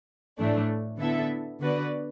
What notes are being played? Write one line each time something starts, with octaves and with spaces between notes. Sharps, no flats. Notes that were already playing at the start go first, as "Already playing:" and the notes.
A2 E3 A3 D4
D3 B3 E4 A4 E5
D3 B3 F#4 B4 D5